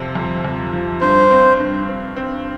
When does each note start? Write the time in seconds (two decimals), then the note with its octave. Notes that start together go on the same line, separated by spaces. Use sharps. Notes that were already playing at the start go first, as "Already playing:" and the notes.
Already playing: F2 C3 F3
0.15 F2
0.45 F2
0.73 F3
1.01 G2 C5
1.31 C4
1.60 G2
1.89 C4
2.16 C4